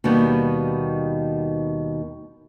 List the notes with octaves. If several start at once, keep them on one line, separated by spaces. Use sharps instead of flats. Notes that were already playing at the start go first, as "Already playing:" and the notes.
D#2 B2 D#3 G3 B3